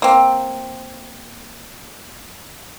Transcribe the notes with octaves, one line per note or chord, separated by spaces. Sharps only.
A#3 C4